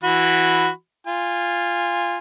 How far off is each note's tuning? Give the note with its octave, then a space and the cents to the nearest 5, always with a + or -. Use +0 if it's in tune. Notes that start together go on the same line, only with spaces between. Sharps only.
E3 +0 F#4 -5 B5 +0
F4 -5 G#5 -25